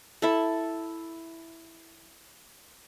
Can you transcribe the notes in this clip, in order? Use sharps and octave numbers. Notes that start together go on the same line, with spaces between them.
E4 A4